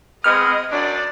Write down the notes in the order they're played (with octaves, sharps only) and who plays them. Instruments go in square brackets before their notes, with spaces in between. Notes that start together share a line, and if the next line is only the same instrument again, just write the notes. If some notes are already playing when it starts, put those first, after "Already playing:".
[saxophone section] G#3 B3 C4 [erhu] D#5 [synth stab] F6
[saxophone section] F#2 D4 [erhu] D5